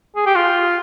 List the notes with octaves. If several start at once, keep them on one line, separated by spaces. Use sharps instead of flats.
G#4
G4
F4